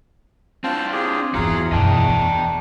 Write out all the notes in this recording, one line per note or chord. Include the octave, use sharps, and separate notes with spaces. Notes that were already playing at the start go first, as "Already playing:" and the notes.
C4 D4 F4 G5 A5
F4 G4 G#4
E2 G2 E3 F4 F#4 G#4 F5 A#5
F#2 B2 D4 D#5 G5
A3